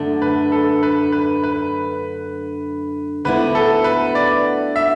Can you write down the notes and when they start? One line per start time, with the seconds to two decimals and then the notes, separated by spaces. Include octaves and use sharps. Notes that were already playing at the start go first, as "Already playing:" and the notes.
Already playing: F#2 D3 A3 D4
0.22 B4
0.52 A4
0.83 B4
1.12 B4
1.44 B4
3.25 D2 D3 B3 E4 B4
3.55 A4
3.84 B4
4.15 D5
4.76 E5